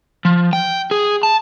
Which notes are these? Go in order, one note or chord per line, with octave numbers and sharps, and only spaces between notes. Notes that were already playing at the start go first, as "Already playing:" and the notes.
F3
G5
G#4
A5